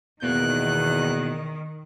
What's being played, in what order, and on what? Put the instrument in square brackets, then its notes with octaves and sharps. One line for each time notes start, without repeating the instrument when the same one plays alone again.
[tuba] E2 [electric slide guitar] B2 A#3 [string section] D#3 [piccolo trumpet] F#6